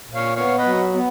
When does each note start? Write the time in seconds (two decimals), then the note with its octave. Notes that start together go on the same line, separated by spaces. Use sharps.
0.08 A#2
0.15 C#5 F5
0.36 B3 C#5 F5
0.58 B4 D#5
0.65 F#3
0.93 B3